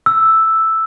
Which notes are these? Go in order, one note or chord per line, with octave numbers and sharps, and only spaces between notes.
E6